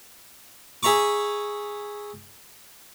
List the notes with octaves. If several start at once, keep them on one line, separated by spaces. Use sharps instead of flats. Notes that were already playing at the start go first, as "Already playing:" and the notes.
G#4 E5 A#5 C#6 D6